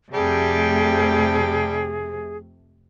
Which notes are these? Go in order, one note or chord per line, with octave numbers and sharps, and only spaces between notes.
F2 C3 G3 A3 G#4 A4 G5